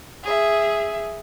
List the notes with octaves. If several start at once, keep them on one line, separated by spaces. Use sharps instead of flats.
G#4 E5